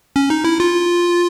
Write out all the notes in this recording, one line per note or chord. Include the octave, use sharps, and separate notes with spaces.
C#4
D#4
E4
F4